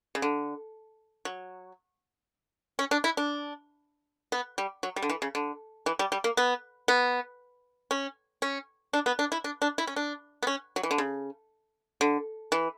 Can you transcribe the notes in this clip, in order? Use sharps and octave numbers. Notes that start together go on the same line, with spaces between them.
C#3
D3
F#3
C#4
D4
E4
D4
B3
G3
F#3
G3
D3
E3
C#3
D3
E3
G3
G3
A#3
B3
B3
C#4
C#4
D4
B3
D4
E4
D4
D4
E4
C#4
D4
B3
C#4
F#3
E3
D3
C#3
D3
E3